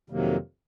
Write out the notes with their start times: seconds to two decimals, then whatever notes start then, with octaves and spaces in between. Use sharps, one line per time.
0.10 F2 C3 D#3 F#3 A#3